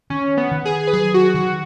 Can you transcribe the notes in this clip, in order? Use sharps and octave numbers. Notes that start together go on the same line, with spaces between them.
D#3 C#4
B3
D#3
G#4
B4
F#3 G#4
F#4
D#3 F#4